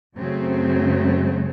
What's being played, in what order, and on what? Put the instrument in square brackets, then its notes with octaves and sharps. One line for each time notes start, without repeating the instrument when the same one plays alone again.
[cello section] F#2 C#3 F#3 A3 C4